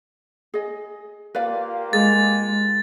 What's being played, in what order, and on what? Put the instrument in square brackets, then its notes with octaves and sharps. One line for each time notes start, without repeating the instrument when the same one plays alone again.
[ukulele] G#4 D#5
[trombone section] A#3 F4 G4 [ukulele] B4 D5 F5
[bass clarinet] G#3 [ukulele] G#4 [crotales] A6